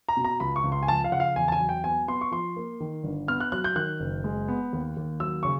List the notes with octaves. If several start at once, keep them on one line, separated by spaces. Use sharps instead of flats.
A#5
B2
A#5
C#2 B5
C#6
C#2
C6
G#5
F3 A5
F5
C#3 F#5
F5
E2 G#5
A5
G#5
F#3
G5
B3 G#5
B3 C6
C#6
F3 C6
A#3
D#3
G1
B3 F6
F#6
F#3 F#6
G6
D#3 F#6
F#1
G#3
B3
D#2
D#2
F#3 E6
C#3 C#6